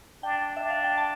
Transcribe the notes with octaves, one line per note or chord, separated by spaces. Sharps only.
D4 G5
D4 E5
F5
G5
A5